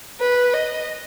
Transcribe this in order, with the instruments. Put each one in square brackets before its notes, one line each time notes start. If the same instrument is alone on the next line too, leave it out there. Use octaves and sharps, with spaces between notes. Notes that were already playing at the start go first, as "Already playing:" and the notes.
[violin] B4
D#5